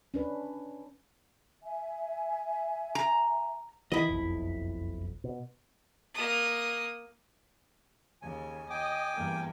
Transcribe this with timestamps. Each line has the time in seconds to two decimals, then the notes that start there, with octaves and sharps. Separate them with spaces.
0.14 C#4 D4 B4
1.63 E5 G#5
2.95 A#5
3.92 D#3 E3 E4 D#5
4.09 F#1 B1 F2
5.24 B2
6.14 A#3 D#6
8.22 D#2 C#3 G#5
8.70 D#5 G5 G#5 D6
9.14 E2 G2 A#3